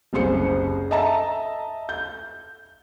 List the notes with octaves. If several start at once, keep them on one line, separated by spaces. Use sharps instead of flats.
F#1 C2 G#4 C5 C#7
D#5 E5 A5 A#5
G6